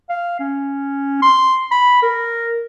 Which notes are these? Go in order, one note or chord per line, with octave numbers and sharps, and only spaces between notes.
F5
C#4
C6
B5
A#4